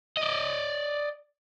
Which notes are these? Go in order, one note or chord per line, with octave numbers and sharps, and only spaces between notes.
D5 D#5